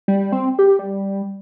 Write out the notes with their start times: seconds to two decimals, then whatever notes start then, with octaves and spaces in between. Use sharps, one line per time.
0.08 G3
0.32 C4
0.59 G4
0.79 G3